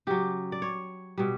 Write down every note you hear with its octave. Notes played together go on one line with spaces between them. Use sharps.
C#3 F#3 G4
D5
C#5
B2 G3